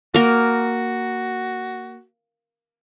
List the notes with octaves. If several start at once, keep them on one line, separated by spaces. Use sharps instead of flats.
A#3 F#4 A#4